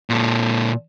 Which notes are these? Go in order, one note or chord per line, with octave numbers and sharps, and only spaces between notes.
A#2 A4